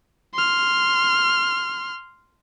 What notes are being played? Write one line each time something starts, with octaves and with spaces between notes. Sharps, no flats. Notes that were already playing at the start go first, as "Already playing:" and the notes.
C6 F6